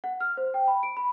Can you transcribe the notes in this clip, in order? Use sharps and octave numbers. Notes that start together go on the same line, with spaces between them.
F#5
F6
C5
G5
B5
D7
B5